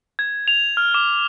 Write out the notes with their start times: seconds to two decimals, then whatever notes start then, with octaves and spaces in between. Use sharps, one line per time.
0.19 G#6
0.48 F7
0.77 F6
0.94 D6